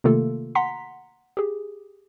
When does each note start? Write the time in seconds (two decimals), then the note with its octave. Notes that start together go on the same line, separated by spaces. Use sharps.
0.04 C3 D#3 A3 A#3 F4 A4
0.55 F#5 A#5 C6 B6
1.37 G4 G#4